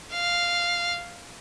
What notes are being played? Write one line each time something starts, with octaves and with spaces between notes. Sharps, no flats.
F5